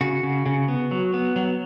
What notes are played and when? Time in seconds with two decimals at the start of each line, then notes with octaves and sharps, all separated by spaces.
0.01 C#3 F#4
0.23 C#3
0.46 C#3
0.68 B3
0.91 F#3
1.14 B3
1.36 F#3